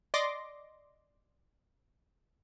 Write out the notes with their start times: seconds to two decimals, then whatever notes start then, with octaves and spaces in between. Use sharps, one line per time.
0.14 D5 D#5 C6 D6 A#6 D7